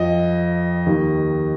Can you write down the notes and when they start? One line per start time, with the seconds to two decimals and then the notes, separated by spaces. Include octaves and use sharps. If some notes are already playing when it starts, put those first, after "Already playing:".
Already playing: F2 F3 D#5
0.86 D#2 D#3